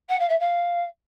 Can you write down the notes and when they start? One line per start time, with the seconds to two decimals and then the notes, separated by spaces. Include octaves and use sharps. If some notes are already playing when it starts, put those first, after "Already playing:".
0.09 F#5
0.19 F5
0.29 E5
0.40 F5